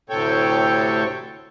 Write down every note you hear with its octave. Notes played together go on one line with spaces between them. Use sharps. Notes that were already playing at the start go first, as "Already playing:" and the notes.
D2 A2 C3 A4 C#5 G5